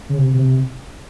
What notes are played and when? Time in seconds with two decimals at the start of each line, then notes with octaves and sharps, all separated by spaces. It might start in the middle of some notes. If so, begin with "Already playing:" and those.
0.09 C#3
0.17 C3
0.34 C3